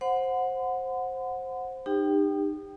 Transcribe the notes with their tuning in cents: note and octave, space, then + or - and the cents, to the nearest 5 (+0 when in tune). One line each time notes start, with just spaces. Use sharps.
C5 +10 F#5 -15 C6 -45
D#4 -35 G4 +25 G5 -5